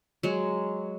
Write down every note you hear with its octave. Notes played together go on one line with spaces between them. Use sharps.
F#3 G#3